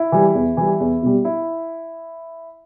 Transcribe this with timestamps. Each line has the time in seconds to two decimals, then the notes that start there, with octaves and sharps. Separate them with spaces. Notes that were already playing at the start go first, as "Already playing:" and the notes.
Already playing: E4
0.12 E3 G3
0.34 E2
0.57 E3 G3
0.80 E2
1.02 B2 G3
1.25 E4